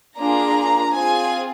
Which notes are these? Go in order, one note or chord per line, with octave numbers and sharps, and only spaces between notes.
A#3 D4 F4 G#4 A#5
C4 F4 G#4 G#5